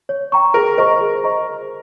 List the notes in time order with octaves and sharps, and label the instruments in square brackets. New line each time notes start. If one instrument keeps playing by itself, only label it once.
[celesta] C#5
G5 A#5 C#6
[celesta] G#4 [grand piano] A#4
[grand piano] A#4 [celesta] C5 D#5 A#5 C#6
[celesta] G#4
C5 D#5 A#5 C#6